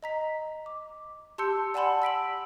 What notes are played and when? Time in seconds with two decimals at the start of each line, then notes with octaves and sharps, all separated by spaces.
0.03 D#5 A#5 B6
0.66 D6
1.38 G4 A5 C6 E6 G6 C#7
1.74 D5 F#5 G#5 A5 B5 C6
2.02 E6 B6 D7 F#7